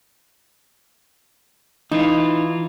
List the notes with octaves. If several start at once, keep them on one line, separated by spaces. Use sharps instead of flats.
E3 D#4 F4